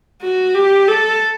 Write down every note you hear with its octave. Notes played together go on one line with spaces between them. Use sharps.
F#4
G4
A4